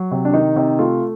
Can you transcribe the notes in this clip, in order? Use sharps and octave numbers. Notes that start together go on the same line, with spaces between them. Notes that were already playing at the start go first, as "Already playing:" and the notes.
Already playing: F#3
C3
D4
D#3 D#4
C3
A3 F4